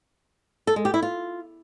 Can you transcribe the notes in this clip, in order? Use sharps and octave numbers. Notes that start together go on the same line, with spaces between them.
A4
G#3
G4
E4
F4